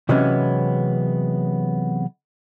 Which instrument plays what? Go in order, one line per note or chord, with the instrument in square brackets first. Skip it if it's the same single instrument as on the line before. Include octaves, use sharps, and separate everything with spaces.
[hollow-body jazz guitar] C3 E3 F#3 G#3 B3 C#4